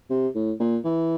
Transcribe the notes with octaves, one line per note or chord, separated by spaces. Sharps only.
C3
A2
A#2
E3